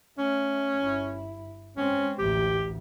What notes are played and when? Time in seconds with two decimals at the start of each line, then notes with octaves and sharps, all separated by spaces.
0.18 A3 C#4
0.82 G1 E4
1.77 G#3 C4 C#4
2.19 A1 D2 G4